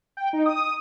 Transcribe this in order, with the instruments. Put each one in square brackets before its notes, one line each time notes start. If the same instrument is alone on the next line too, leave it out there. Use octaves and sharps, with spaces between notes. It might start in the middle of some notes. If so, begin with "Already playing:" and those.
[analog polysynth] G5
D#4
D#6